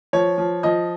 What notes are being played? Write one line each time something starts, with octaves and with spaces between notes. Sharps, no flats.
F3 C#5
F3
F3 D#5